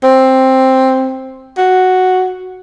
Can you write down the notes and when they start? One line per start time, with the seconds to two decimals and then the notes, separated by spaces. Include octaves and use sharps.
0.03 C4
1.57 F#4